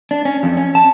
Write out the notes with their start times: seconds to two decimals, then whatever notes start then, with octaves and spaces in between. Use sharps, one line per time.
0.11 D4
0.25 C#4
0.43 F2
0.57 C#4
0.75 A5